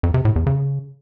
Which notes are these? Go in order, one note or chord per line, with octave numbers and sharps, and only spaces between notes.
F2
C3
A2
E2
C#3